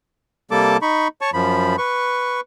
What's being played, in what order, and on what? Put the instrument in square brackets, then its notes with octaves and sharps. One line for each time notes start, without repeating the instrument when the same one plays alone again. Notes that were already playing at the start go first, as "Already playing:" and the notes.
[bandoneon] C3 G3 A#3 A4 A5 D6
D#4 B5 C#6
C#5 A5 C#6
F#2 F3 B5
B4 C#6